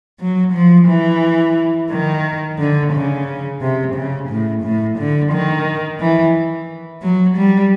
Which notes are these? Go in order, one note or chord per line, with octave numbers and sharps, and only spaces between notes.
F#3
F3
E3
D#3
D3
C#3
C3
C#3
A2
A2
D3
D#3
E3
F#3
G3